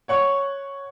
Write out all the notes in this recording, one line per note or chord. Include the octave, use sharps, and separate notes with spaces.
C#5 F#5 C#6